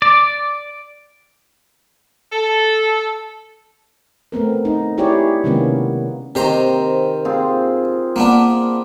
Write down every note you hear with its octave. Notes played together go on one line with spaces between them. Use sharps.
D5
A4
A3 B3 C4 A#4
D#4
E4 G4 G#4 C#5 D5
C3 D#3 G#3 A#3 B3 C#4
C3 D#3 C4 C5 A#5
C4 F4 G#4
A#3 B3 D4